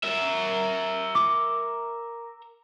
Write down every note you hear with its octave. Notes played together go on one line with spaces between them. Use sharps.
A#4 E5
D6